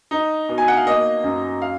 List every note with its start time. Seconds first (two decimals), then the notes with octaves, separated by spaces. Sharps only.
0.11 D#4
0.49 B2
0.58 G#5
0.68 F#5
0.77 F5
0.87 A#3 D#5
1.23 F#2
1.62 F5